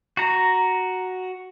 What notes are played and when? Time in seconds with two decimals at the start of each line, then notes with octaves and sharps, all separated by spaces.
0.17 F#4 A#5